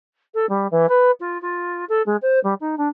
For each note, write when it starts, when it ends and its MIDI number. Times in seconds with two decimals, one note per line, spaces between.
0.34 0.48 69
0.49 0.67 55
0.71 0.86 52
0.89 1.11 71
1.20 1.40 65
1.42 1.85 65
1.89 2.02 69
2.06 2.17 56
2.22 2.40 72
2.44 2.54 55
2.60 2.75 63
2.78 2.88 62